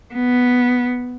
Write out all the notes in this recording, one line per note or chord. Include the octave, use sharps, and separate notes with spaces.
B3